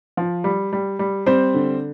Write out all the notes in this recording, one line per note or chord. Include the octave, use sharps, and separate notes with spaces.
F3
G3
G3
G3
G3 C4 C5
D3